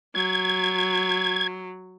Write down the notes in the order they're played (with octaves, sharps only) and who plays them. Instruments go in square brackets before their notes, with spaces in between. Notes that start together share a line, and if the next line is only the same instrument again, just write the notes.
[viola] F#3 [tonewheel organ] G#6